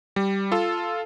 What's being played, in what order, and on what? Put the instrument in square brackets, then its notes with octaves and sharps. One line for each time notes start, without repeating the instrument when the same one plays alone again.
[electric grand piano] G3
F4 A4